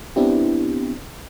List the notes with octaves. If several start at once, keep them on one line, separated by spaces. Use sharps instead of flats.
B3 C4 D4 E4 G4